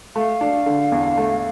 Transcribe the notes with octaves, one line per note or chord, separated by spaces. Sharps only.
A3 F5
D4
D3
E2
A3